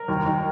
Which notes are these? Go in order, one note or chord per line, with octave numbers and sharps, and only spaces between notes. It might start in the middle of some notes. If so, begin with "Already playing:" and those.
Already playing: A#4
D#2
D#2